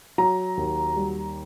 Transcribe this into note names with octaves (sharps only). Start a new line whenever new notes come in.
F#3 A#5
D#2
G3